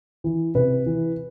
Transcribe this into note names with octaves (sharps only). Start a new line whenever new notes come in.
E3
C3 B4
E3